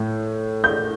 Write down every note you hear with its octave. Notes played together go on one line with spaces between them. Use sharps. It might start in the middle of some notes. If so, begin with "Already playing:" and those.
Already playing: A2
G6